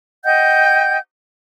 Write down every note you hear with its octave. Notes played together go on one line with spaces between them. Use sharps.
D#5 F#5 G5 G6